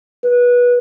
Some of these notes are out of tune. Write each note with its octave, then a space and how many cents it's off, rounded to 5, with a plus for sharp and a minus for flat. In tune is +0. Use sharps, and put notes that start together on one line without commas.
B4 -20